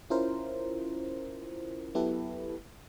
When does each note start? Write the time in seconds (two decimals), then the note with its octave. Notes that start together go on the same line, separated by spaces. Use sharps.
0.10 C#4 E4 F4 A#4 C5
1.94 F#3 B3 E4 G4 A4 B4